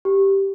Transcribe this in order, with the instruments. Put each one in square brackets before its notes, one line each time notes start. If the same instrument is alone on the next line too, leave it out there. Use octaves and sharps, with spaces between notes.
[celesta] G4